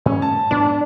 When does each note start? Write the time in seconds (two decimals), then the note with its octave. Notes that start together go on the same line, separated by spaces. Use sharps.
0.06 G#2 C#4 C#5
0.22 A5
0.51 D2 G#2 B3 D4